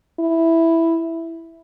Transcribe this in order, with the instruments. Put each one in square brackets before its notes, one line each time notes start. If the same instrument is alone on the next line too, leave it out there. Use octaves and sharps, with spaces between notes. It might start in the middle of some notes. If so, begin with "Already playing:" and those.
[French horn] E4